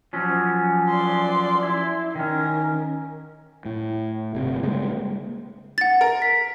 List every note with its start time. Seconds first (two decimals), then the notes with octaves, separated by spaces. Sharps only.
0.13 F3 F#3 C#4
0.89 D5 C6
1.63 E4
2.15 D#3 C#4 A#4
3.65 A2
4.34 G1 C3
4.63 C#3 G3 G#3 A#3
5.78 F#5 A6
6.01 A#4
6.22 B6